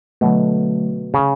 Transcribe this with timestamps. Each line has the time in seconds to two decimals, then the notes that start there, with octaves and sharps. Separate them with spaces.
0.21 B2 D3 F#3 A3
1.14 C#3